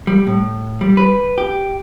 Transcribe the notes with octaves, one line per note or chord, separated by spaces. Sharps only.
G3
A2
G3
B4
G4